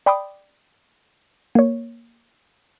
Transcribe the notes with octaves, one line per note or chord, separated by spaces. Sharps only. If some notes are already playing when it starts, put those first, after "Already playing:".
D5 G5 B5 C6 D6 D#6
A#3 C#5